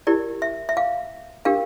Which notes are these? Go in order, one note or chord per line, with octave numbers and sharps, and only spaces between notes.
E4 G4 A#4 D5
E5
E5
F5
D4 G4 A#4 F5